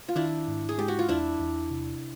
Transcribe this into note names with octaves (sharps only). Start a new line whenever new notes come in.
F4
D#3 D4 E4
G#2
G#4
G#3 G4
F#4
F4
E2 D4 E4
E2
C3